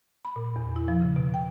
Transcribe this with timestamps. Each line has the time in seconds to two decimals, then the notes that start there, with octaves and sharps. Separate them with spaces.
0.25 B5
0.36 A#2
0.56 E2
0.76 E4
0.88 F3
1.01 C#3
1.16 B2
1.34 G5